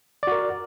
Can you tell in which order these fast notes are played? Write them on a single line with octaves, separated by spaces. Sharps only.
D5 F#4 A#4